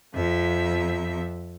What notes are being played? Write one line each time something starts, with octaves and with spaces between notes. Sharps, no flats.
F2 F3 E5